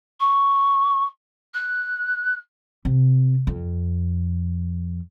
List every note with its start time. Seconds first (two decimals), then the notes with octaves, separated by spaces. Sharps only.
0.20 C#6
1.54 F#6
2.85 C3
3.47 F2